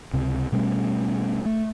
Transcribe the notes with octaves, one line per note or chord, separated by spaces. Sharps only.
C#2 C3
B2 G3 A3 C#4
A3